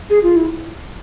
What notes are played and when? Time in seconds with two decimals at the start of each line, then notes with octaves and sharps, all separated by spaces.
0.10 G#4
0.23 F4
0.36 E4